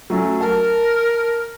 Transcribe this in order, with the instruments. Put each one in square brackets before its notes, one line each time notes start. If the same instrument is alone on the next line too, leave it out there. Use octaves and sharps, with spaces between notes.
[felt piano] F#3 A3 C#4
[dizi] A#4 [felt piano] A5